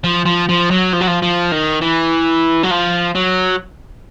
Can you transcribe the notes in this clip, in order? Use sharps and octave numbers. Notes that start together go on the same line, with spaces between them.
F3
F3
F3
F#3
F3
F#3
F3
F3
D#3
E3
F#3
F3
F#3